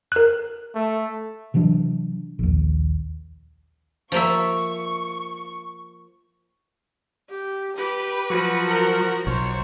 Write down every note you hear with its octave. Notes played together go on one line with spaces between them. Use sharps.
A#4 F#6
A3
C3 E3 F#3 D4
A#1 D#2
F3 A#3 E5 C#6
G4
G4 B4
F3 F#3 F#4 C#6
A#4
B1 C5 C#5